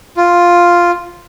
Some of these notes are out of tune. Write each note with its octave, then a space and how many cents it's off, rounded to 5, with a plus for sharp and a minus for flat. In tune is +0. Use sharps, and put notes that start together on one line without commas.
F4 +0